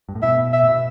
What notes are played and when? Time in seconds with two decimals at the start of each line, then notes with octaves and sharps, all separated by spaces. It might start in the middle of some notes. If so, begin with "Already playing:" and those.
0.09 G2
0.15 A2
0.22 B2 E5
0.53 E5
0.63 A2
0.68 B2